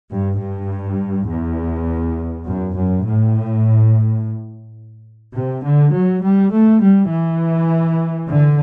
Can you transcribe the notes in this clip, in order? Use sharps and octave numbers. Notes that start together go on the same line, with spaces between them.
G2
G2
E2
F#2
F#2
A2
C3
D3
F#3
G3
A3
G3
E3
D3